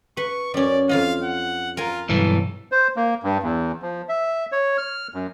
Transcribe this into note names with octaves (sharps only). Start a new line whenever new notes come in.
B4 C#6
F#2 C#4 D5
F2 F4 D#5 F5
F#5
F4 A#4 G#5
B1 G2 E3 A4
C5
A#3
G2
E2
F3
E5
C#5
F6
F#2